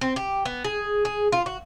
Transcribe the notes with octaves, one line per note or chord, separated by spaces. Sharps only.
C4
G4
B3
G#4
G#4
F4
F#4